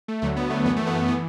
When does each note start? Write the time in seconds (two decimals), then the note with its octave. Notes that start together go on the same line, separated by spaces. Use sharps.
0.08 A3
0.22 D2 D3 F#3 A3
0.36 B3
0.50 A3
0.65 F#2 E3 B3
0.76 A3
0.87 B3
0.98 A3
1.08 E3 B3